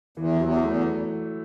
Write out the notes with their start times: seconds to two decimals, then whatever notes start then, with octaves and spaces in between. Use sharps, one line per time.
0.17 E2 E3
0.40 E2 F#3
0.64 E2 A3